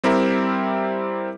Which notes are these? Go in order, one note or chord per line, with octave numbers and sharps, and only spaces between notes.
G3 C4 E4 G4 A#4 E5